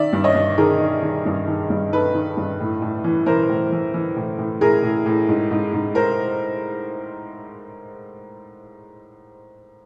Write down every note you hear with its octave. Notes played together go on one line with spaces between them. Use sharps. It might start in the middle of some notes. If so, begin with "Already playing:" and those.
Already playing: D#3 D5 E5
G2
C#5 D#5
G2
D#3 G#4 A#4
D#3
D#3
G2
D#3
G2
D#3 A4 B4
D#3
G2
A2
A2
E3
E3 A#4 C5
A2
E3
E3
A2
A2
A2 G#4 A#4
A2
A2
G#2
G#2
G#2
A#4 C5